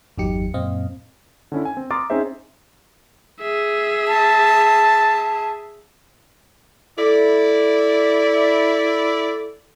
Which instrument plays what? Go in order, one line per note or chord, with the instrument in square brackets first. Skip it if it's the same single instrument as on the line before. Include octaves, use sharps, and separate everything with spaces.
[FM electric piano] G1 E2 F#3 D#4 G4 C#7
F#2 A#2 C4 D#5 F5
[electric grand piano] D3 C#4 E4
G#5
C4
A#5 C6 D6 D#6 F6 A6
C4 C#4 D#4 G#4 C5 E5
[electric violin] G#4 E5
[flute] A5
[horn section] E4 D5 [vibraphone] A4